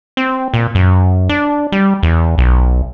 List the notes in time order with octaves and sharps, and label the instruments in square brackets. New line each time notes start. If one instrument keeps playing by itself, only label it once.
[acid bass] C4
A#2
F#2
D4
G3
E2
B1